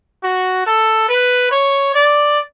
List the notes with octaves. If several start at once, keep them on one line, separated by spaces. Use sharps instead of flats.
F#4
A4
B4
C#5
D5